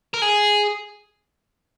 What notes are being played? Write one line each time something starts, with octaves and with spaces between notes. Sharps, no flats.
A#4
G#4